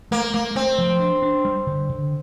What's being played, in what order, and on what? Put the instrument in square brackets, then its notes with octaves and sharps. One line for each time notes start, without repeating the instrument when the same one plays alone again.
[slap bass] A3 [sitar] A#3
[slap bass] A3 [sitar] A#3
[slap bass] A3 [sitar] C4
[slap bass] F3
D4
D4
G3
D3
D3